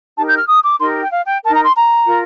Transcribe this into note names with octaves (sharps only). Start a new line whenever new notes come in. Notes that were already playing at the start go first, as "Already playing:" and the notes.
D#4 G4 A#4 A5
G6
F6
D#6
D6
D#4 G4 A#4 C6
G5
F5
G5
D#4 A#4 A5
A#5
C6
A#5
F4 A#4